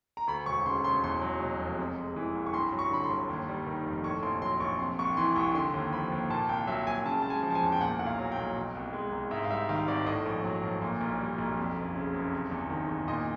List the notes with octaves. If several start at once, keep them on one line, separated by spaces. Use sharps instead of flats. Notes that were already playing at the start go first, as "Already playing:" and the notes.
A#5
D2 B5
E1 C#6
C#3 C6
E1 C6
E2 C6
F#3
B2
F1
C3
G#3
E3
C2
C#6
G2 C6
F#3
C#6
D3 B5
C6
G1
D#2
G3
D#3
F1
A2 C#6
A#1 C6
F#3 C6
A#1 C#6
C3 C6
C2 C#6
E3 C6
C2 C#6
D3 C6
D#2
F3 B5
D#2
A#2 A5
C2 G5
F#3 E5
C2 G#5
C#3 A5
G#3 A5
G#5
F3
A5
G#5
E2
G5
A#2 F#5
B1 F#5
F5
F#3
G5
B1
B2
C2
G#3
C2
G#2 E5
F5
G3 E5
D#3 F5
G#1 D5
A2 D#5
A#1
F#3
A#1
A#2
B1
G3
B1
F2
F#1
C#3
F#1
C3
E2
D#3
E2
A#2 D#5